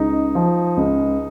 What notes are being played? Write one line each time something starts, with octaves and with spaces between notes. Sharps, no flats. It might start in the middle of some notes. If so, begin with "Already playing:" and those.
Already playing: C#2 D#4
F3
C#2